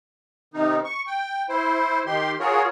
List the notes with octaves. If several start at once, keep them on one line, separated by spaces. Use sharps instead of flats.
C3 D#3 D#4
C#6
G5
E4 C5
D#3 G4 C6
F4 F#4 G#4 A#4 C#5